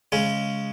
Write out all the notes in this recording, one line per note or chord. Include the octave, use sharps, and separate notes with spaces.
C#3 G#3 C#4